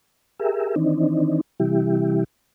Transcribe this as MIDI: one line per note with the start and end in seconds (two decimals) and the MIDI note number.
0.39 0.75 67
0.39 0.75 68
0.39 0.75 70
0.39 0.75 76
0.76 1.41 51
0.76 1.41 52
0.76 1.41 60
0.76 1.41 62
0.76 1.41 63
1.60 2.24 48
1.60 2.24 52
1.60 2.24 55
1.60 2.24 64
1.60 2.24 67